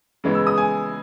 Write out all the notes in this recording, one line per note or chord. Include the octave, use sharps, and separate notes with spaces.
C#3 E3 G#3 B3
E6
D#6
G#5